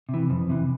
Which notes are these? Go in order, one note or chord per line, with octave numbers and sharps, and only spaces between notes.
C3
E3
F2
C3 E3